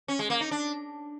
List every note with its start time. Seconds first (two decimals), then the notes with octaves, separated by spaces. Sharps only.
0.08 C#4
0.19 G#3
0.30 A#3
0.41 D#4
0.51 D4